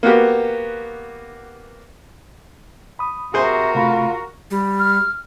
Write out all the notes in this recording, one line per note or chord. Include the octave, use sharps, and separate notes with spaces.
A#3 B3 F#4 G4
B5 D#6
C3 F#4 G#4 A#4 C5
C3 A3 F4 B5
G3
F6